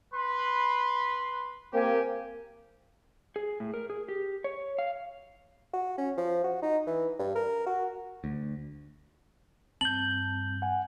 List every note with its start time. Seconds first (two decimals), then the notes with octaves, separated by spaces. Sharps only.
0.13 B4 B5 C6
1.73 A#3 C4 G4 G#5
3.36 G#4
3.60 A2
3.74 A#4
3.90 G#4
4.09 G4
4.44 C#5
4.78 F5
5.73 F#4
5.98 C#4
6.17 F3
6.44 F#4
6.62 D#4
6.87 E3
7.19 G2
7.35 A#4
7.67 F#4
8.24 D2
9.81 G2 C4 A5 G6 F#7
10.62 F#5 G#5